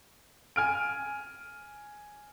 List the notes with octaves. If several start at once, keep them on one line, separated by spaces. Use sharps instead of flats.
G#5 F6 D7